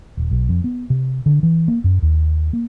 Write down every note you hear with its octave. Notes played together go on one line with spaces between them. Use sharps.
D#1
B1
F2
B3
C3
D3
E3
A#3
F#2
D#2
A#3